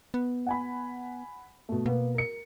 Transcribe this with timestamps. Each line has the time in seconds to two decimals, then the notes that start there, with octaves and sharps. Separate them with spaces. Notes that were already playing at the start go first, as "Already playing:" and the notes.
0.14 B3
0.46 F#5 G#5 B5
1.69 B2 A3
1.86 B2 A#3 B3
2.14 A#4 C#7